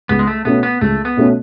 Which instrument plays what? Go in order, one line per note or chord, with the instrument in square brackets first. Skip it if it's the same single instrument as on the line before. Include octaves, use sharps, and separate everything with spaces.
[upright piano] C#2 [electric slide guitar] B3
[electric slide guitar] G#3
A3
[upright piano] B2 A3 C#4 [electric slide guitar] B3
[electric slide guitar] B3
[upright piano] C#2 [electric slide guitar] A3
[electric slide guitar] B3
[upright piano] B2 A3 C#4